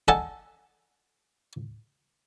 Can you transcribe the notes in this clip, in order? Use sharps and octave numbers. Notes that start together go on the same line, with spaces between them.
A4 D#5 F#5 G#5 A5